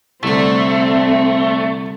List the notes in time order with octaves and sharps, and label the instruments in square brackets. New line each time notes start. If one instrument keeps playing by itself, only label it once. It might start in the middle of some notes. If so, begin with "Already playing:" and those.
[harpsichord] C2 D3 [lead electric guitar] A3 [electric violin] C4